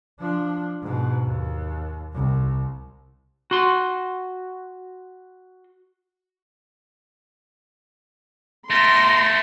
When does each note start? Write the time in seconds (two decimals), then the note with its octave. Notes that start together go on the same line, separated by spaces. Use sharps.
0.20 F3 D4
0.82 G#2 B2
1.25 D#2
2.14 C2
3.51 F#4 C6
8.70 A3 A#4 C6 A#6